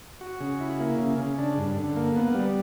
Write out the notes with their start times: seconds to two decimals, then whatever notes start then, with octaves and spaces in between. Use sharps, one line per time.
0.21 F#4
0.40 C#3
0.60 E4
0.80 A#3
0.99 C#3
1.18 C#3
1.38 D4
1.58 G2
1.77 D3
1.96 A#3
2.16 B3
2.34 G3